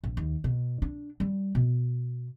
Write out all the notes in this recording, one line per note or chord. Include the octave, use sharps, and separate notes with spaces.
A#1
D#2
B2
D4
G3
B2